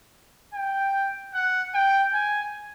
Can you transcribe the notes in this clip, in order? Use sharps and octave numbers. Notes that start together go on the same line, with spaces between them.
G5
F#5
G5
G#5